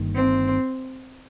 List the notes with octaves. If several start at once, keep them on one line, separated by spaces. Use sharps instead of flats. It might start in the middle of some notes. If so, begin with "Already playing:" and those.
Already playing: G1 G2 D#3 A#3
C4